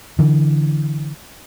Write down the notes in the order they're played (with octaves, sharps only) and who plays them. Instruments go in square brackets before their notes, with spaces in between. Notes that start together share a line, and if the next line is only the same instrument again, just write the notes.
[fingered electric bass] D3 E3